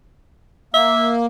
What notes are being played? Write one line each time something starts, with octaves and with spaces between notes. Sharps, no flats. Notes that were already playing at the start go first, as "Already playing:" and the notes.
A#3 E5